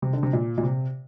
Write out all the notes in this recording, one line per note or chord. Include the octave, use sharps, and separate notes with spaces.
C3
D3
C3
A#2
A#2
C3